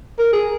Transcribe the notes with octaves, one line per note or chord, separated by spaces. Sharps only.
A#4
G#4